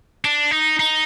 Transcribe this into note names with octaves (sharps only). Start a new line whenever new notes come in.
D4
D#4
D#4